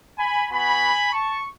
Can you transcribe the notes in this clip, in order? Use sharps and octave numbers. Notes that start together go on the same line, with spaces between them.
G#5 B5
B3 F#4 G#5 B5
A5 C#6